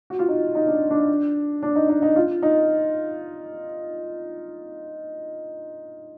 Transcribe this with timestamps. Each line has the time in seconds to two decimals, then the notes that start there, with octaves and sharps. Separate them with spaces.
0.10 F#4
0.19 F4
0.28 D#4
0.55 D#4
0.67 D4
0.90 D4
1.63 D4
1.76 D#4
1.89 D#4
2.02 D#4
2.16 F4
2.43 D#4